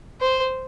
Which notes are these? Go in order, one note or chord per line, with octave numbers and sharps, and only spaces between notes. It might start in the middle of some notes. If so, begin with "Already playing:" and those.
C5